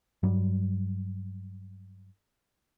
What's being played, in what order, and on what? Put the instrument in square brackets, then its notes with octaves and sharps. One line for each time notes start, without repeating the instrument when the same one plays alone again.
[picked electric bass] G2 F#3 G3